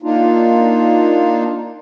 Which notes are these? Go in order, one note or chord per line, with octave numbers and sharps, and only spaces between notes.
A#3 D4 D#4 F4